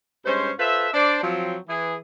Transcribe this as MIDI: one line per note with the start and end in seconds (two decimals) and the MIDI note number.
0.25 0.50 43
0.25 0.50 56
0.25 0.50 61
0.25 0.50 72
0.59 0.88 65
0.59 0.88 69
0.59 0.88 71
0.59 0.88 72
0.59 0.88 76
0.93 1.19 62
0.93 1.19 72
0.93 1.19 74
1.23 1.57 53
1.23 1.57 54
1.23 1.57 60
1.68 1.95 52
1.68 1.95 68